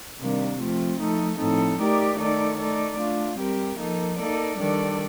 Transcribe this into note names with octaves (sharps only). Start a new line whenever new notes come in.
C3 D#3 G3 A#3 D4
F3 A3 C4 F4
F3 A3 D#4 A4
A2 F3 C4 D#4 A4
A3 D#4 G4 A#4 D5
D#3 A3 D#4 A4 D5
A3 D#4 A4 D5
A3 D4 F4
G3 C4 G4 A#4
F3 A#3 D#4 A4
A#3 D#4 A4 D5
D#3 G3 D4 A4 D5